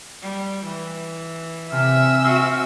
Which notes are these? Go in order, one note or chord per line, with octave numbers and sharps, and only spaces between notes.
G3
E3
C3 E5 G#5 E6 F6
C4 F#4